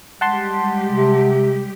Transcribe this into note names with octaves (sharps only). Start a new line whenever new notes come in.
G3 G#3 G4 F#5 A5 C6
C3